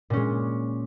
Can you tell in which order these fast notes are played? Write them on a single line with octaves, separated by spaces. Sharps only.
A#2 C#4 G#3